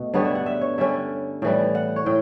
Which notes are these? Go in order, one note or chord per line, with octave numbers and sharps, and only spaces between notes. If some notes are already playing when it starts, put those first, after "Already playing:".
Already playing: B2 A3
G2 D3 G3 B3 C#5
E5
F#5
E5
C#5
D3 G3 C#4 E5
A2 E3 G3 G5
F#5
C#5
A2 G5